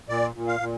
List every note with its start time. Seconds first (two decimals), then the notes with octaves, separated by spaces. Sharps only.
0.09 A#2 D5
0.35 A#2
0.48 F5
0.60 A#2